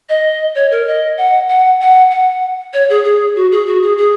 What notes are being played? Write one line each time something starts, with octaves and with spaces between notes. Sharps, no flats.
D#5
C#5
A#4
D#5
F#5
F#5
F#5
F#5
C#5
G#4
G#4
F#4
G#4
F#4
G#4
G#4